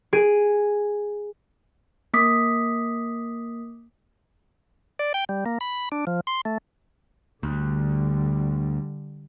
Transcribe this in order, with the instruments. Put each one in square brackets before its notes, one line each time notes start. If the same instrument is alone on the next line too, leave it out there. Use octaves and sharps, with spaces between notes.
[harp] G#4 D7 D#7
[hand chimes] A#3 D6 D#6 B6
[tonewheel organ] D5
G5
G3
A#3
B5
D4
F3
C6
A3
[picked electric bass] D2 [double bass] D3 G3